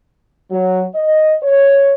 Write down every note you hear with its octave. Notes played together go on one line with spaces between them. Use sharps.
F#3
D#5
C#5